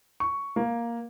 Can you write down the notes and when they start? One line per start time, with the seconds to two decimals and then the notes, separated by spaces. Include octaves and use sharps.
0.20 C#6
0.56 A#3